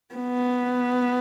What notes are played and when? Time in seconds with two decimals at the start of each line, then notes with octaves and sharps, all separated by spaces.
0.15 B3